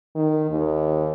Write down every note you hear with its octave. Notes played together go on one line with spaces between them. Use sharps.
D#3
D#2